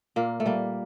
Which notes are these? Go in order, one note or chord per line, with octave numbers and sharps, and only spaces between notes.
A#2 A#3
A3
G3 A#3